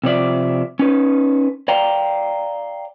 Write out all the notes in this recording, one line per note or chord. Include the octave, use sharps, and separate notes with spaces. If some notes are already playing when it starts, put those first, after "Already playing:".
C3 F3 D5 E5
C#4 D#4 B4
D5 F5 G5 A#5